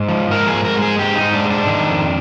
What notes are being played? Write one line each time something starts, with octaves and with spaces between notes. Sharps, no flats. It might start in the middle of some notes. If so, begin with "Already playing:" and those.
Already playing: G#2 C5
F3
G#2 A#4
G#4
G#2
A#4
G#3
G#4
G#2 G4
D#4
G#2
D4
G#3
D4
D#3
F2